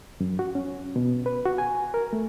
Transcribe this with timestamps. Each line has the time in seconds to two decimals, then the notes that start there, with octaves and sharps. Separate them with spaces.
0.20 F#2
0.39 F#4
0.55 C#4
0.96 B2
1.26 B4
1.45 F#4
1.58 G#5
1.94 A#4
2.13 A3